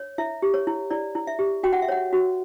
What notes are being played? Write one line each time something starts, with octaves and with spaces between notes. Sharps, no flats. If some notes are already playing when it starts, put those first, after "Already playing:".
Already playing: C#5
E4 E5
G4
C#5
E4
E4 D5
E4
E5
G4
F#4 G5
F#5
E5
C#5 F#5
F#4